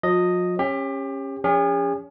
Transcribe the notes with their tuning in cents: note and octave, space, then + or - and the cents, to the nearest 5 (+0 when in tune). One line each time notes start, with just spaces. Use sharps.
F3 +45 D#5 +0
C#4 -20 G4 +30
F3 +0 C#4 +30 G#4 -40